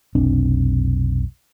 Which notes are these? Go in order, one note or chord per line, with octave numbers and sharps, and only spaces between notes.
F1 B1 C4 D4